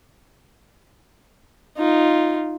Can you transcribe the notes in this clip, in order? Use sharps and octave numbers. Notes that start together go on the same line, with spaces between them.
D#4 F4